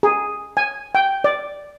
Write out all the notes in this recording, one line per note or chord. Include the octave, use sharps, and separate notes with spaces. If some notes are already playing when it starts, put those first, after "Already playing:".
G#4
G#5
G5
D5